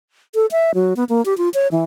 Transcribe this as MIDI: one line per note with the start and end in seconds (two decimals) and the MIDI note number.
0.35 0.46 69
0.51 0.72 76
0.75 0.94 54
0.96 1.04 59
1.09 1.24 58
1.25 1.37 67
1.38 1.49 65
1.54 1.68 73
1.72 1.84 52